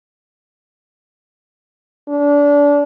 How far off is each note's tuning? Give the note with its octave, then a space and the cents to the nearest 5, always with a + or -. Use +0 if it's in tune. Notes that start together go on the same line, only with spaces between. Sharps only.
D4 -25